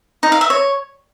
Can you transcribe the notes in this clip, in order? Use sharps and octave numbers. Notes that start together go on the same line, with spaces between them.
D#4
F5
E5
C#5